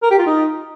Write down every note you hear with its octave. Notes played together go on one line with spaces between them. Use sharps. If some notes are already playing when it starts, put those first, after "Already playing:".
A#4
G4
F4
D#4